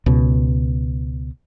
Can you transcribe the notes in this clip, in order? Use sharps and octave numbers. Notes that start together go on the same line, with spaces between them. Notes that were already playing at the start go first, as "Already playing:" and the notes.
C#2 B2